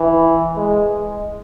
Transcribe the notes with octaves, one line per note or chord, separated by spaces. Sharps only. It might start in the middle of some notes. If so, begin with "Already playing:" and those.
Already playing: E3
G#3